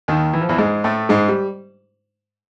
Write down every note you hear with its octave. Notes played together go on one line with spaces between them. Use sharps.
D#2 D#3
E3
F3
E2 E3
G#2 G#3
A2 A3
G#2 G#3
G3